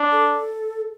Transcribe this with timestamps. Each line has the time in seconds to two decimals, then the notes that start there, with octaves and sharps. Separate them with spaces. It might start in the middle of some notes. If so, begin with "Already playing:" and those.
Already playing: D4
0.12 A4